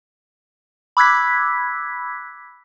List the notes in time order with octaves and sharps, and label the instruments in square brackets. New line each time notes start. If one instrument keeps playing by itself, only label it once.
[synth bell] B5 D6 E6 F#6 G#6 B6